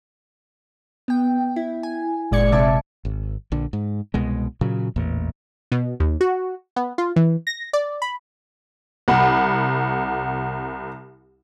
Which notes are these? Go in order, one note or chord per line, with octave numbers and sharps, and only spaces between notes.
B3 G5
E4
G#5
G1 A#2 G#3 D5 G#6 C#7
C3 E5 A5 D6
G#1
A#1 D3
G#2
C2 B2 G#3
A#2 C#3 F#3
A1 E2 A#2
B2
D#2
F#4
B3
F4
E3
A#6
D5
B5
C2 F#5 B5